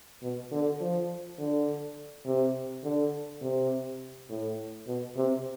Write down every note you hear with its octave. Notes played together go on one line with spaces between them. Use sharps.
B2
D3
F3
D3
C3
D3
C3
A2
B2
C3